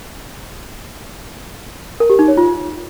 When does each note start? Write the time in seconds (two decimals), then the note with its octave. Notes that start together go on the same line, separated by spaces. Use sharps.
2.00 A#4
2.10 G4
2.19 D#4
2.28 C#5
2.37 F4